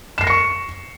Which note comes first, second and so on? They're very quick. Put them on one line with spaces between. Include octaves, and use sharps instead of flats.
E7 C7 A#6 C#7 C#6